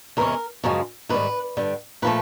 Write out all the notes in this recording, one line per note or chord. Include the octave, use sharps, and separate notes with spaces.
E2 C3 E3 G#3 C#4 A#4
F#2 C#3 F3 G#3
G#2 D#3 G3 B4
G2 D3 G3
A#2 F3 A3 B4